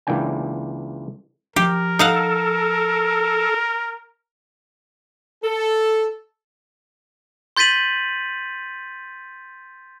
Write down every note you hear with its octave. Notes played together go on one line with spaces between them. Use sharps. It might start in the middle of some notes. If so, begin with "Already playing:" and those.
C#2 E3 A#3 D4 G5 G#5
F3 G4 A#4
D#4 A4 F5 F#5
A4
C6 G6 A6 B6 D#7 F#7